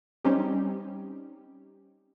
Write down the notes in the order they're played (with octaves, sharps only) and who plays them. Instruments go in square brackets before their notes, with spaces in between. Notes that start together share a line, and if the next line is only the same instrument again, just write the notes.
[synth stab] G3 C4 C#4 D#4 G4